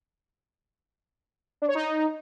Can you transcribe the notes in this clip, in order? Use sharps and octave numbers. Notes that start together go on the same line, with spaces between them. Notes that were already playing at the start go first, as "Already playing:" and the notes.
D4
C#5
D#4